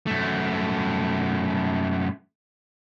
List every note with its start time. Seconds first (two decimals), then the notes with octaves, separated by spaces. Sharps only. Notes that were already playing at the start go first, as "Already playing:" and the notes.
0.07 F#2 A3